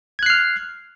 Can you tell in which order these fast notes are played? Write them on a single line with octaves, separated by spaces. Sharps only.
G#6 F#6 C7 F6